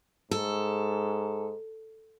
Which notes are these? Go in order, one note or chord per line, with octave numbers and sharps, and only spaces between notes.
G#2 A4